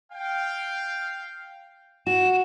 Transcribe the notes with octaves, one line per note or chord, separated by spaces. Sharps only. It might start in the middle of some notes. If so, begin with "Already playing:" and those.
F5 G5
F#4 E7